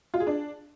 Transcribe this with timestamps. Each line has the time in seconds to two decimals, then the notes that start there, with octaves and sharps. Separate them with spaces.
0.14 F4
0.20 G#4
0.27 D4